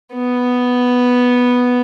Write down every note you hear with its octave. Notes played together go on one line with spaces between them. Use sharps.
B3